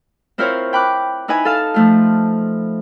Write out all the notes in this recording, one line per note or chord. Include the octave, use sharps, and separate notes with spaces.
C4 E4 F4 A#4 C5 C#5
G5 B5 D6 F#6
D#4 E4 B4 D#5 G#5
A4 F5 A5
F3 A3 F4